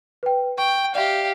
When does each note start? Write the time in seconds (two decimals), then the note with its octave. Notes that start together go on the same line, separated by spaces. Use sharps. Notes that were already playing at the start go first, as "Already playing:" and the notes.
0.23 B4 G5
0.58 G5 C#6
0.95 G4 D5 E5 F5